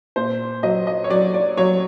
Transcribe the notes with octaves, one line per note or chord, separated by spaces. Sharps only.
A#2 C5
F#3 D#5
D#5
C#5
F#3 D5
D5
F#3 C#5